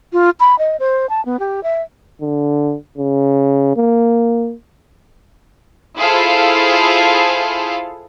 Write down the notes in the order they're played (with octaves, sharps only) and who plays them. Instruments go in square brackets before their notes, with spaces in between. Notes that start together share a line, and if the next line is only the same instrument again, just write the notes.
[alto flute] F4
B5
D#5
C5
A5
B3
G4
E5
[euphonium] D3
C#3
A#3
[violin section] E4 F4 G#4 A4 C5 F5